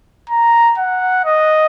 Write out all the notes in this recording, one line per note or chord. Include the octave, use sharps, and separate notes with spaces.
A#5
F#5
D#5